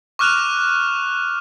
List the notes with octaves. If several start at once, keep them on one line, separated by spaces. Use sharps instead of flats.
C#6 D6 F6 F#6 E7 F7